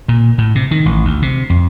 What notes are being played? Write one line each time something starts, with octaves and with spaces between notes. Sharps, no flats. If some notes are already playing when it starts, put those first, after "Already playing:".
A#2
A2
C3
D#3
A1
D2
C3
F2